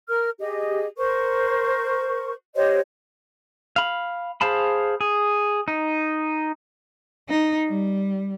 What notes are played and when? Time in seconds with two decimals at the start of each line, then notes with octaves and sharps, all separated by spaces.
0.08 A#4 F6
0.40 G4 G#4 D#5
0.98 A#4 C5 C#6
2.55 G4 C5 C#5 D#5
3.76 F5 B5
4.41 G#4 C5 F5 A5 B5
5.01 G#4
5.68 D#4
7.29 D#4
7.68 G3